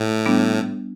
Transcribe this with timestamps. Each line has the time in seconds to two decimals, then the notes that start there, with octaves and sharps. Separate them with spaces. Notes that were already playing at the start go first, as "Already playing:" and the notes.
Already playing: A2
0.26 G3 B3 D4